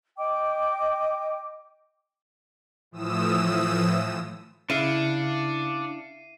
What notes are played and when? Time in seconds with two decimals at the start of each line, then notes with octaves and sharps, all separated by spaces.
0.18 D#5 G5 D6
2.91 A2 E3 F3 D#6 E6 E7
4.70 C#3 D4 E4 F5 C7 C#7 D#7